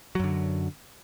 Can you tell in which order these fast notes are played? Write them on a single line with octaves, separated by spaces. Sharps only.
F#3 F#2 D3